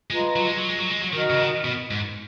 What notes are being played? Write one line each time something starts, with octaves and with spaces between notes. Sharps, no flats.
G#3 F4 B4 D#5 A#5
F#3
G#3
F#3
G#3
F#3
G#3
F#3
D#3 F#4 A#4 D#5
C#3
D#3
B2
G#2